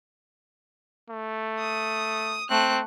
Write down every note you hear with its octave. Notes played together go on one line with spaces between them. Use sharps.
A3
D#6
A3 C4 F#6